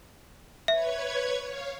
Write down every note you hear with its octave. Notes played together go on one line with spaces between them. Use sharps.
B4 C#5 E5 G#6
C#5 F5